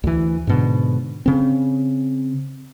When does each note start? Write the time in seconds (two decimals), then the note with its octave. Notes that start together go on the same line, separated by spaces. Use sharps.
0.03 D2 E3
0.47 G#2 B2 D3
1.26 C#3 C4